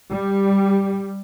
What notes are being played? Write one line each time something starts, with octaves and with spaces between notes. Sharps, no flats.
G3